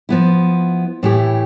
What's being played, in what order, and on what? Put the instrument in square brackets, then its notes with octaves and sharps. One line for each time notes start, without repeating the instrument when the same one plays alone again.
[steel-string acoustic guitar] F3 B3 E4
A2 E3 A3 E4 G4